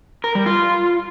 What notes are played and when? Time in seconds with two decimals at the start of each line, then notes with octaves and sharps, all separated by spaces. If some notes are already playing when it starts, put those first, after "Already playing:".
0.24 A#4
0.35 G3
0.46 F4